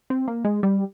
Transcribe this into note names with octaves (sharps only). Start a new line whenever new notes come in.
C4
A#3
G#3
G3